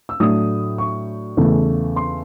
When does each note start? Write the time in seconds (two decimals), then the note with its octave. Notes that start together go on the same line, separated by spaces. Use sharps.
0.09 E6
0.20 A2 F#3 A3 D4 D#6
0.78 C#6
1.37 E2 C#3 E3 A3
1.96 C6